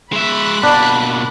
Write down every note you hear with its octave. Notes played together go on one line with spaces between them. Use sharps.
G#3 E5 B5 F#6
B2 A#3 D4